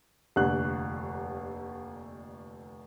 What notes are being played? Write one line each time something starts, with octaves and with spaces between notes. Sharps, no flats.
F1 D#2 D3 D4 F#6